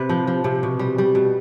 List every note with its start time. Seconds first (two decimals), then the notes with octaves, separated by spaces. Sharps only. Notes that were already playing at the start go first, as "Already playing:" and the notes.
Already playing: C3 B4
0.09 F3
0.27 F3
0.44 C3
0.63 B2
0.79 G3
0.98 G3
1.15 B2